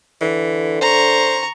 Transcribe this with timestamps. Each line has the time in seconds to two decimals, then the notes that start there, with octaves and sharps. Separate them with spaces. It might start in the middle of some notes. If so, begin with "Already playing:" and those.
0.21 D3 E3
0.81 C5 A#5 C#6